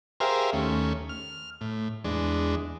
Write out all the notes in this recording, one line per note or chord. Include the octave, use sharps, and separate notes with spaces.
G4 G#4 A#4 C5 E5 F5
D#2 A3 C#4
F6
A2
E2 G#3 D4